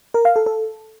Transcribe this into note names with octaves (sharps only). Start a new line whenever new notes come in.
A#4
F5
A4
A4